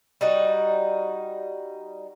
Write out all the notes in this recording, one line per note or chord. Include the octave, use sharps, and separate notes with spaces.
G3 D#4 F#4